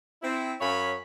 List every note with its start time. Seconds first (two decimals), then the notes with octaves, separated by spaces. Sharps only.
0.22 C4 E4
0.61 F#2 C#4 C#5 F5 B5